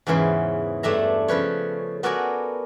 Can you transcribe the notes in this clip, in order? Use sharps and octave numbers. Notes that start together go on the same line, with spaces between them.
E2 G#2 C#3 E3 C5 B5
G2 A3 D4 E5 A#5
C#3 F3 B4 C#5
B3 F#4 A4 A#4 D5 G#5